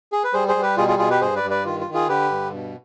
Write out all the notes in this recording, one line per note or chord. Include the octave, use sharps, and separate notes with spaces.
G#4
B4
G3 G#4 C5
G#4 C5
G3
G4 B4
B2 F4 G#4
F4 G#4
B2 F4 G#4
G4 B4
G2 G#4 C5
B4 D5
G2
B4 D5
D#3 F4
F4
D#3
F4 G#4
D3 G4 B4
G2
B2